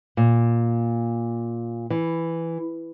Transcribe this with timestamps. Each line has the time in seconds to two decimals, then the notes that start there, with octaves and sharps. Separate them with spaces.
0.17 A#2
1.90 E3